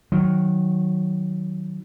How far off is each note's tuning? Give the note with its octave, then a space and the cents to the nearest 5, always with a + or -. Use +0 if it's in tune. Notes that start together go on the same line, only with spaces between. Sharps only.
D#3 +0 F#3 +0